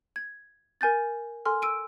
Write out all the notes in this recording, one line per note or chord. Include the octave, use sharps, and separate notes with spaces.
G#6
A#4 G#5 G6 A6
A4 G#5 C6 F6
E6 D7 D#7